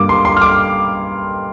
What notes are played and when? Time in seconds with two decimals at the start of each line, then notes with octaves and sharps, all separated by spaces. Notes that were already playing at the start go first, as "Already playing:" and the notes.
Already playing: G2 G3 A#3 D6
0.09 C6
0.25 C6
0.37 F6
0.42 D6